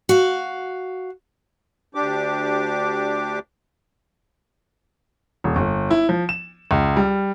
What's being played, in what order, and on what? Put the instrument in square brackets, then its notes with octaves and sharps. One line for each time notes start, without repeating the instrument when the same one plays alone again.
[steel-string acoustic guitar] F#4 F5
[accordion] D2 D4 G4 D6
[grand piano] D#1
G1
E4
F3
E7
C#2
G3